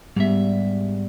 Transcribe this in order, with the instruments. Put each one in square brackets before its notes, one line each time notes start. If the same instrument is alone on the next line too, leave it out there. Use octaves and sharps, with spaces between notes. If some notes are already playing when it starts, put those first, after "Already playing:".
[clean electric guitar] G#2 E5 [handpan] G3 B3